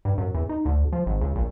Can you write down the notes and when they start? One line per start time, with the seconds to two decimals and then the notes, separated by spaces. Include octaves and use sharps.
0.05 G2
0.18 F#2
0.35 E2
0.49 D#4
0.66 D2
0.93 F3
1.06 G#1
1.21 C#2
1.36 A#1